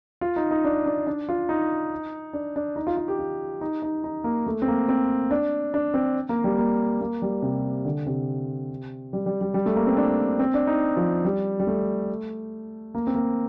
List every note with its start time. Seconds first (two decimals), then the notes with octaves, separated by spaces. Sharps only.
0.21 F4
0.36 D#4
0.51 D#4
0.65 D4
0.86 D4
1.07 D4
1.29 F4
1.49 D#4
2.33 D4
2.56 D4
2.76 D#4
2.87 F4
2.97 F4
3.08 G4
3.19 F4
3.61 D#4
3.82 D#4
4.04 D#4
4.24 A#3
4.47 A3
4.62 C4
4.68 A#3
4.89 C4
5.31 D4
5.74 D4
5.94 C4
6.29 A#3
6.44 G3
6.58 A#3
7.01 A#3
7.22 G3
7.42 C3
7.85 D3
8.06 C3
9.13 G3
9.26 G3
9.41 G3
9.54 G3
9.66 A3
9.76 A#3
9.87 C4
9.97 D4
10.39 C4
10.54 D4
10.67 D#4
10.97 F3
11.25 G3
11.60 G3
11.67 A3
12.95 A#3
13.07 C4
13.15 A#3